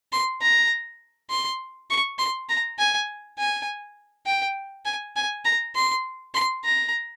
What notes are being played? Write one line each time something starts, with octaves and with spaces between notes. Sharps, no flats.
C6
A#5
C6
C#6
C6
A#5
G#5
G#5
G5
G#5
G#5
A#5
C6
C6
A#5